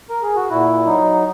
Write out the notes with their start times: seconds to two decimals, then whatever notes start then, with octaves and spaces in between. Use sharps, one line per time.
0.10 A#4
0.23 G#4
0.36 F#4
0.50 A#2 E4
0.86 F#3 D#4